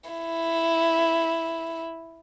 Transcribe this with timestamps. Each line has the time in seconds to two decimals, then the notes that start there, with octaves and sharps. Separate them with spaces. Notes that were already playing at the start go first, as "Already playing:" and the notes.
0.10 E4